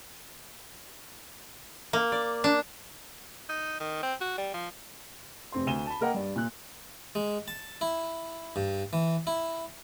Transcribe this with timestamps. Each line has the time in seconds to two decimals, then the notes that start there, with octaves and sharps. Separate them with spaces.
1.93 A#3
2.12 D5
2.44 D4
3.49 D#4
3.80 D#3
4.03 C4
4.21 F#4
4.38 G3
4.54 F3
5.52 F1 C4 C6
5.67 D2 D#7 E7 G7
5.86 A5 B5
6.01 A#3 A#4 D#5 F#5 G5
6.14 G2 D5
6.36 A#2 F4 F#6
7.15 G#3
7.48 A5
7.81 E4
8.56 G2
8.93 E3
9.27 E4